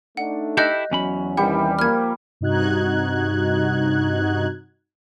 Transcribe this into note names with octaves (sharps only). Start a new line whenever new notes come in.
A3 D4 D#4 F#5
E4 G4 A4 D#5 F#6 G6
E2 F#3 C#4 B5
C3 D#3 E3 G3 F#5
F3 A#3 F6 G#6
G2 C3 D#4 F#4 F#6 G#6